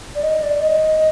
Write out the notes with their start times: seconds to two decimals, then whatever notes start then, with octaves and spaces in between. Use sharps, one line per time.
0.15 D5
0.23 D#5
0.42 D5
0.62 D#5